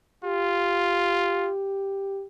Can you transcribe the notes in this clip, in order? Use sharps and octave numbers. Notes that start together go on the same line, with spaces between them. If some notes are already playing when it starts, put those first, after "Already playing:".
F4 G4